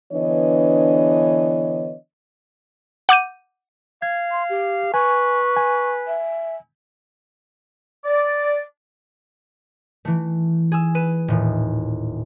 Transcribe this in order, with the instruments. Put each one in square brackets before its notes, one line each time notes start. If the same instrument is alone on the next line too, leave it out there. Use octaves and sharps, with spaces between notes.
[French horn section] D3 E3 B3 D4 C#5 D#5
[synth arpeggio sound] F#5 D6 G6 D#7
[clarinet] F5 [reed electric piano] G#6
[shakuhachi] C6
G4
[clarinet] B4 [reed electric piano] G#5 [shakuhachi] C#6
[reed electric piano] G#5
[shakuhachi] E5
[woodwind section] D5
[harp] E3 A3
G#4 E6
B4 D#7 E7
D#1 A2